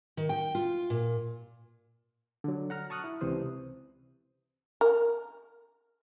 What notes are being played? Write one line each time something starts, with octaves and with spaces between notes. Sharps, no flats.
D#3
G5
F4
A#2
D3 F#3
F#5 A#5 F6
A5 C#6 D#6 F6 F#6
E4
C#2 C3 E3 C5 D#6
A#4